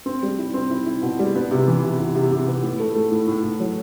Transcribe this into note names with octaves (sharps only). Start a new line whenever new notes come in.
C4
G3
E4
C4
E4
E4
B2
G3
B3
C3
E3
C3
C3
C3
C3
B3
A2
A3
A3
A2
A2
A2
F#3